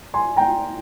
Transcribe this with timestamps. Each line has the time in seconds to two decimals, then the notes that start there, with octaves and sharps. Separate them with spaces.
0.14 G#5 C6
0.36 G5 A#5